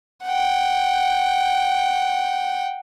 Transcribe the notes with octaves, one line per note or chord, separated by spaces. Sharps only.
F#5 G5